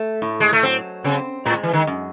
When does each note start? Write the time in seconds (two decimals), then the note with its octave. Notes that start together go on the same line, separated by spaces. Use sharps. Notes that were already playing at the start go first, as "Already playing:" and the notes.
Already playing: A3
0.22 A2
0.40 G#3
0.53 A3
0.63 F#3 C4
1.04 C#3 C4
1.45 A2 G#3
1.63 E3
1.73 D#3
1.87 F#2